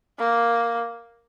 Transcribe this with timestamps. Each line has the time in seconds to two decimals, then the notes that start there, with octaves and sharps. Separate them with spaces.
0.19 A#3